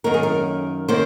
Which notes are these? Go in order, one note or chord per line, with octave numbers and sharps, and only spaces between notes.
F#2 D#3 A#3 C#4 A#4
G#4
A#4
D#3 A#3 C#4 C5